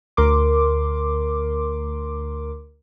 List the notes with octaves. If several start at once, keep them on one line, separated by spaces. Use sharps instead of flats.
D2 A#4 C6 D6